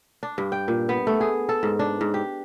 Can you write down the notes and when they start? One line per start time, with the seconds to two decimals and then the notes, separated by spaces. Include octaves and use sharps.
0.23 D4
0.38 G2
0.52 G5
0.68 A#2
0.89 B3
1.07 A3
1.21 G#4
1.49 A4
1.63 G#2
1.79 D4
2.01 G#2
2.14 G4